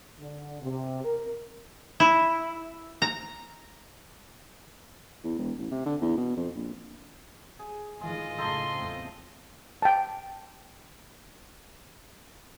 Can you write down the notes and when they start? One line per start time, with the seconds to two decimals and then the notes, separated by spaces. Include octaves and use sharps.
0.19 D3
0.61 C3
1.04 A#4
2.00 E4
3.02 A#5
5.24 E2
5.39 E1
5.59 A1
5.72 C3
5.86 D3
6.02 E2
6.17 B2
6.37 F2
6.55 A#1
7.59 G#4
8.01 A2 D#3 E3 G#3 F4 D#5
8.38 F#2 A2 C#3 D#4 A4 A5 C6
8.73 E2 A3 C4
9.82 G5 A5